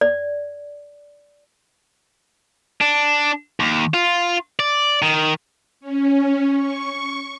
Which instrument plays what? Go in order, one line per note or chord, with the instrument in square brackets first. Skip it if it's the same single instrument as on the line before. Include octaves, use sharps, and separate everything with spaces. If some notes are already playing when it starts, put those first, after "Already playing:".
[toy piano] D5
[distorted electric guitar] D4
D#2
F4
D5
D#3
[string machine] C#4
C#6